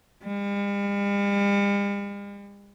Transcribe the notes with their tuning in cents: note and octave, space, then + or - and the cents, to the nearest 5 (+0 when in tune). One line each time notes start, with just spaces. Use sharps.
G3 +45